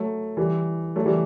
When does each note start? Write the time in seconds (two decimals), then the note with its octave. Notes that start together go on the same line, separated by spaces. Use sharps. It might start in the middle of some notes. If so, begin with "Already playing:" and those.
Already playing: F#3 A3
0.37 E3 G3
0.96 F#3 A3
1.05 E3 G3